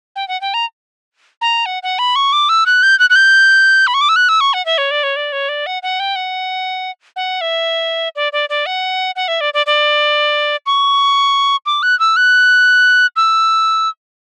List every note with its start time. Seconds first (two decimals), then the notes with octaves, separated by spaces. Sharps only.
0.16 G5
0.28 F#5
0.41 G5
0.54 A#5
1.41 A#5
1.66 F#5
1.83 F#5
1.99 B5
2.16 C#6
2.33 D6
2.49 E6
2.66 F#6
2.83 G6
2.99 F#6
3.10 F#6
3.16 G6
3.87 B5
3.94 C#6
4.01 D6
4.09 E6
4.16 F#6
4.29 E6
4.41 C#6
4.54 F#5
4.66 E5
4.78 C#5
4.91 D5
5.03 C#5
5.16 D5
5.32 C#5
5.49 D5
5.66 F#5
5.83 F#5
6.00 G5
6.16 F#5
7.16 F#5
7.41 E5
8.16 D5
8.33 D5
8.50 D5
8.66 F#5
9.16 F#5
9.28 E5
9.41 D5
9.54 D5
9.66 D5
10.66 C#6
11.66 D6
11.83 F#6
11.99 E6
12.17 F#6
13.16 E6